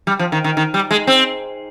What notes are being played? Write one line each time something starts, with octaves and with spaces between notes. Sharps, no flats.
G3
F3
D#3
D#3
D#3
G3
G#3
C4